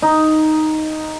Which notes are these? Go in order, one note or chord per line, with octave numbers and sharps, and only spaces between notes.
D#4